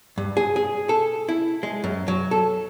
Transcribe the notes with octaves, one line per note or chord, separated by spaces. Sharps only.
G2
G#4
G#4
A4
E4
G#3
F#2
F#3
A4